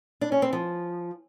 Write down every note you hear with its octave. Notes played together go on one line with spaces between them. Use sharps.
D4
C#4
C4
F3